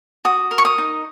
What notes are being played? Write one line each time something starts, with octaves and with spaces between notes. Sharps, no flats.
F#4 D#6
A#4
C#6
D#6
D#4